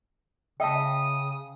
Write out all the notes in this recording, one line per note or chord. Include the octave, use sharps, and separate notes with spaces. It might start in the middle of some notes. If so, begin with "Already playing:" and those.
C#3 D#5 E5 G5 A5 D#6